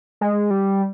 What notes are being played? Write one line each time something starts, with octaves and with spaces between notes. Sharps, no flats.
G#3
G3